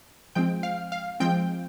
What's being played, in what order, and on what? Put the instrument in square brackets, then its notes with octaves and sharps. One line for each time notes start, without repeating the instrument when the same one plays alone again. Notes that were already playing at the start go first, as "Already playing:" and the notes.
[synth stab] F3 G#3 C4 G5
F5
F5
F3 G#3 C4 G5